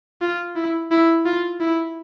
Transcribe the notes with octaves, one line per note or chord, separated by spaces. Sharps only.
F4
E4
E4
F4
E4